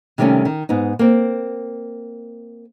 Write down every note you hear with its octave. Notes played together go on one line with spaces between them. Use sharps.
C3 D#3 G3 A3 C4 C#4
D#3
G#2 B3 D#4
A#3 C4